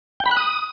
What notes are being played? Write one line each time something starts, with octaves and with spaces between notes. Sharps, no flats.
G5
B5
F#6
D#6